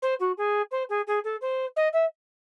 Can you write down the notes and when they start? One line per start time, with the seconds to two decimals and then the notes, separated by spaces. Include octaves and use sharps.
0.02 C5
0.20 F#4
0.38 G#4
0.71 C5
0.89 G#4
1.07 G#4
1.24 A4
1.41 C5
1.76 D#5
1.93 E5